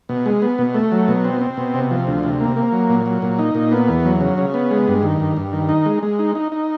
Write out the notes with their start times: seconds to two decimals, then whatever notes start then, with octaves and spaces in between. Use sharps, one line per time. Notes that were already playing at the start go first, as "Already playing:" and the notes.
0.09 B2
0.26 G#3
0.42 B3
0.58 B2
0.75 A3
0.92 F#3
1.08 B2
1.24 C4
1.41 C4
1.57 B2
1.74 C3
1.91 F3
2.07 D2
2.23 C3
2.40 A#3
2.56 A#3
2.72 F#3
2.89 A#2
3.06 F#3
3.22 A#2
3.39 D#4
3.55 A#2
3.71 B3
3.88 E2
4.05 F#3
4.21 C#3
4.38 C#3
4.54 B3
4.71 G#3
4.88 G2
5.03 D#3
5.20 G2
5.37 G2
5.53 D#3
5.69 D#4
5.86 G#3
6.03 G#3
6.19 D#4
6.35 D#4
6.52 D#4